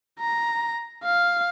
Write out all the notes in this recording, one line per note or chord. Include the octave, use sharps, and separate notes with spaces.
A#5
F5